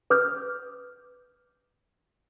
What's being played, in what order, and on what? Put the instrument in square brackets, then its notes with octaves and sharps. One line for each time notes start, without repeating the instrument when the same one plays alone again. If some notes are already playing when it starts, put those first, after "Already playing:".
[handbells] B4 D6 D#6 F6 G6